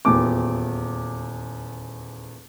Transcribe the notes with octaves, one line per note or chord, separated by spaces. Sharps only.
D#1 E2 D6